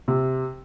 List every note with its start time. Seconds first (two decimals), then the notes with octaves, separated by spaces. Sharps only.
0.08 C3